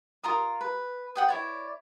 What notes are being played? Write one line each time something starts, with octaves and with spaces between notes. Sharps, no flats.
F4 A#4 A#5 D#6
B4
F#5 G5 D#6
E4 C#5 D5